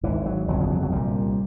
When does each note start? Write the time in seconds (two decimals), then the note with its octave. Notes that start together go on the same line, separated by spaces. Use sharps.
0.03 G#1 G#2 E3
0.26 F#3
0.48 G1 F2 C#3 F#3
0.61 F3
0.70 F#3
0.82 F#3
0.92 C2 A#2 G3